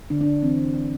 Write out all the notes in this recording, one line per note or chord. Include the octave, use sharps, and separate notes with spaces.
D3 D4
D4
D3
E3 C4